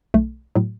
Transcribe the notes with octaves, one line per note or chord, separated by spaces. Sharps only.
B1 A3
A2 F#3